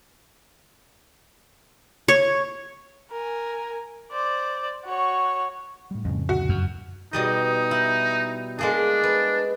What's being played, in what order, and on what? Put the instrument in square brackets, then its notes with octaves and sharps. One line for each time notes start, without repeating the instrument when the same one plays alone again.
[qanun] C#5
[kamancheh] A#4 G#5
C5 D5
F#4 C#5
[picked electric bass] A2 G3
[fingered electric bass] F2 C#3
[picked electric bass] C#2 A#2 D3 [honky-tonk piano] F#4
[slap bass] F#2
[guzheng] B2 G3 D#5 [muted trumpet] D#4
[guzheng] E4
[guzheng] G#3 A#3 G#4 [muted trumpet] D4
[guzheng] B4